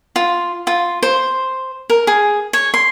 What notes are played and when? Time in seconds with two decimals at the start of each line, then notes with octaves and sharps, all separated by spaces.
0.16 F4
0.67 F4
1.03 C5
1.90 A#4
2.07 G#4
2.53 C#5
2.74 C6